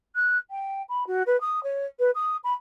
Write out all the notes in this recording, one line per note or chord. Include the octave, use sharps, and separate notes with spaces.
F#6
G5
B5
F#4
B4
D#6
C#5
B4
D#6
B5